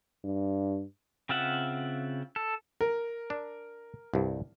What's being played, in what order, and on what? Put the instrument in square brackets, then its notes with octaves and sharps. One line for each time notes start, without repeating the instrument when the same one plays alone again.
[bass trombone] G2
[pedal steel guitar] C#3 C4 F4 E5 F#5
A4
[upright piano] A#4
[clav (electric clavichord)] D4
C2 G2